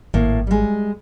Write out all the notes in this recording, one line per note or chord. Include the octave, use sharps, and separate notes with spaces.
G#1 A2 A#3
G3 G#3